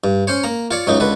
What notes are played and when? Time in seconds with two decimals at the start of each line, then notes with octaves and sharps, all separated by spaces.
0.04 G2
0.27 C#4 C5 C#5
0.44 A#3 A#5
0.71 F4 C#5 D5
0.87 C#2 F#2 C#3 D#4
1.00 C#2 D3 B4